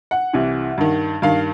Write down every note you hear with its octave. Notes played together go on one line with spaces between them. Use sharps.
F#5
C2 C3 E3
G2 D#3
G2 D#3 F5